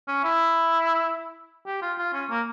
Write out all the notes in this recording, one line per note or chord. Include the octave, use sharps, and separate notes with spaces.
C#4
E4
G4
F4
F4
C#4
A#3